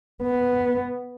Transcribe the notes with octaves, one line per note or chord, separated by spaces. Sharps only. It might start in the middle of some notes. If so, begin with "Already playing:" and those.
B3